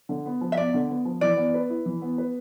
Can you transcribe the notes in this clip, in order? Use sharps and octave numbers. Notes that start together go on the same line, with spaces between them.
D3
B3
F3
E5
E2 D5
D3
B3
F3
E3 D5
B3
B4
E4
E3
B3
B4